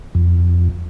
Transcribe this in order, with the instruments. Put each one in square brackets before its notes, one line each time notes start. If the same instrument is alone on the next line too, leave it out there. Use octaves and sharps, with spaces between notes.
[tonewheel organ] F2